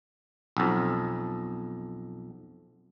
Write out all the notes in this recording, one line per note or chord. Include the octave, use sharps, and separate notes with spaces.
B1 F2